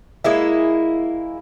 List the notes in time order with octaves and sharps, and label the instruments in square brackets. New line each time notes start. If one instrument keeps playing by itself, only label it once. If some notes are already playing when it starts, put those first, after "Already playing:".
[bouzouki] G#3 A#3 E4